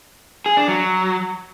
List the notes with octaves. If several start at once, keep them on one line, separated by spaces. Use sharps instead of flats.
G#4
D4
F#3